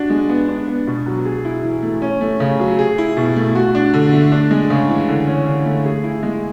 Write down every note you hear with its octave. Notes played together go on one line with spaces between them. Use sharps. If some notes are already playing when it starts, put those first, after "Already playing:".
Already playing: D4 F#4
G#3
B3
D4
B3
B2
F#3
G#4
E4
E3
A3
C#4
A3
C#3
F#3
G#4
E4
B2
A3
F#4
D4
D3
A3
D4
G#3
C#3
E3
D3
C#4
D3
A3
G#4
E4
G#3